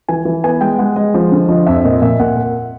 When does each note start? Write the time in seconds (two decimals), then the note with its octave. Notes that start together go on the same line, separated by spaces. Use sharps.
0.08 E3 G#5
0.25 E3
0.44 B3 G#5
0.61 G#3 G5
0.78 G#3 F#5
0.96 G#3 D#5
1.14 F3
1.32 D3
1.49 F3 D#5
1.66 F2 E5
1.84 A#2 D#5
2.02 A#2 E5
2.19 A#2 F#5
2.36 A#3